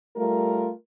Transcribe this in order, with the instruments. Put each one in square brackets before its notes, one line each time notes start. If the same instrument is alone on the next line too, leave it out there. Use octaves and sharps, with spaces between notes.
[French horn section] G3 A3 F4 A#4